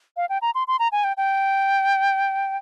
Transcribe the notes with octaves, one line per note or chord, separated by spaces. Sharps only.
F5
G5
A#5
C6
C6
A#5
G#5
G5
G5